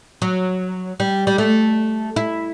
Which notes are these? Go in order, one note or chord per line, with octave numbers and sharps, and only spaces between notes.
F#3
G3
G3
A3
E4